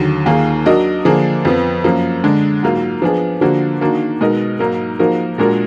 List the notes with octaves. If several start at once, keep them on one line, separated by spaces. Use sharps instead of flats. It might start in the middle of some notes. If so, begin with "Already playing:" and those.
Already playing: D#2 D3 F#3
D#2 D#3 A#3 F4 G#4
F#3 D4 F#4 A#4 D#5
D3 F3 A#3 D4 G#4
F2 F3 B3
F#2 F3 A#3
D3 G#3 D4
G#2 F#3 A#3 F4
F3 B3 D4 G#4
D3 F3 A#3 D4 F#4
D#3 A#3 D4 F#4
B2 G#3 D#4 A#4 D#5
G#2 F#3 A#3 D#4 A#4
F3 A#3 D#4 F#4 A#4
A#2 G#3 D4 F#4 A#4